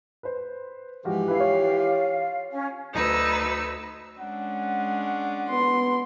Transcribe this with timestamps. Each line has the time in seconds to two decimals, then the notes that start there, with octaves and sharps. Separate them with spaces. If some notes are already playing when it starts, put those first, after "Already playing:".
0.23 B4 C5
1.05 G#2 E3 F3 F#4 G4
1.28 E4 B4 F5
1.40 F4 C#5
2.51 C#4
2.93 D2 D#4 B4 E6
4.20 G#3 C#4 D4 F#5
5.49 B3 C6